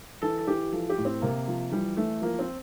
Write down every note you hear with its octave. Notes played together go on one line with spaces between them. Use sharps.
E3 A4
A4
E3 G4
F3 A4
G4
A2
C4
C3 A#3
F3
E3 G3
E3 A3
F3 A#3
C4